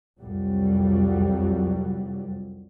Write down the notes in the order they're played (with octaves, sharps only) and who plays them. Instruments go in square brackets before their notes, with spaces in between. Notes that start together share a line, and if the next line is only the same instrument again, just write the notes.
[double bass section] C2 F2 F#3 G3